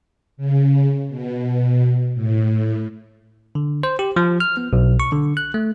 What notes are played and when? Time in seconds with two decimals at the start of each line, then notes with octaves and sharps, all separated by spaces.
0.37 C#3
1.09 B2
2.14 A2
3.55 D3
3.83 C5
3.99 G4
4.16 F3
4.40 F6
4.57 B3
4.73 B1
5.00 C#6
5.12 D3
5.37 F#6
5.54 A3